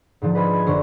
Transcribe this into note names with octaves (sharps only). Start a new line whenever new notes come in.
G#2 D3 F3
B4 C5 D#5 G#5 B5
G#6
G1 F#2 D3 C5 C#5 C7